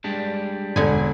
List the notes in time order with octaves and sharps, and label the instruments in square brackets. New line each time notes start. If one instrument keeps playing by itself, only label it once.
[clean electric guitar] G3 G#3 D4
[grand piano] E1 [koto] D3 G#5